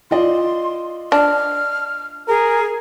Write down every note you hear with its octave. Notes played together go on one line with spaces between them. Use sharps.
F4 D5 D#5 C6
D4 F6
G#4 A#4